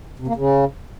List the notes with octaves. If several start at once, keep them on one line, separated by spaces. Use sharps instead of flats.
C3
A#3
C#3